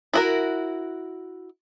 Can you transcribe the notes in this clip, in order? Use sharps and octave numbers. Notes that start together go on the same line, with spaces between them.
E4 F#4 A#4